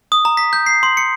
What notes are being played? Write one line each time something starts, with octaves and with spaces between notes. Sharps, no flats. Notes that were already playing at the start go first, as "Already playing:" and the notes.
D#6
A#5
B6
G6
C7
C6
C#7